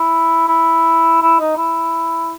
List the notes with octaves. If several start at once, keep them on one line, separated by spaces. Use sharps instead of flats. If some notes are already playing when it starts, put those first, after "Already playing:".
Already playing: E4
E4
E4
D#4
E4